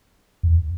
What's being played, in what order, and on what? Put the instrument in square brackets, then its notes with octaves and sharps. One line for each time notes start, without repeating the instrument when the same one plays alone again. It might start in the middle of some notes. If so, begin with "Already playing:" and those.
[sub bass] E2